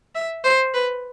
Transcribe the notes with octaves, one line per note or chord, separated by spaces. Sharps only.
E5
C5
B4